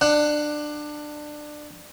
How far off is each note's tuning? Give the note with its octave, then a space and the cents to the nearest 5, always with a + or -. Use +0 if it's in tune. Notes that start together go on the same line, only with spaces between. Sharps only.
D4 +20 F#5 +0